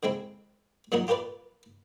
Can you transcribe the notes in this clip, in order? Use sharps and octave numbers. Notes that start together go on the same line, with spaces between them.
D3 G#3 C4 E4
A#2 F#3 G3 D#4 F#4 A#4
F4 G4 A#4 B4 D5